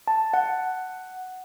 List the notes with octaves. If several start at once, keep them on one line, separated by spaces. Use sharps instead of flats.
A5
F#5